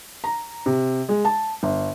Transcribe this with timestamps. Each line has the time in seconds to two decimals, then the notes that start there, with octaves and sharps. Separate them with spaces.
0.24 A#5
0.66 C3
1.09 G#3
1.25 A5
1.63 G1